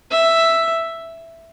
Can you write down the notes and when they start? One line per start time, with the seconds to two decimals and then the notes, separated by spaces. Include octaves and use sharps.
0.11 E5